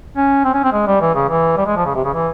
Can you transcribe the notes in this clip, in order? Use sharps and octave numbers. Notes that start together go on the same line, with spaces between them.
C#4
C4
C#4
C4
G#3
G3
E3
C#3
E3
G3
G#3
F3
C#3
C3
C#3
E3